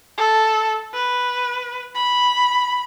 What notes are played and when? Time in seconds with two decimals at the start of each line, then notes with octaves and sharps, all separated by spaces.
0.18 A4
0.93 B4
1.95 B5